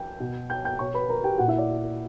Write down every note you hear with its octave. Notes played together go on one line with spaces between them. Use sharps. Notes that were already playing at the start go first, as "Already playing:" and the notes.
Already playing: G5 G6
B2
G5 G6
G5 G6
B2 C#5 C#6
B4 B5
A#4 A#5
G4 G5
A#2 F#4 F#5
E4 E5
D5